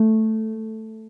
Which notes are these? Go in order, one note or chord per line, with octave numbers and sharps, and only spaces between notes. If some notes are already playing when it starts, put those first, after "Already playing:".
Already playing: A3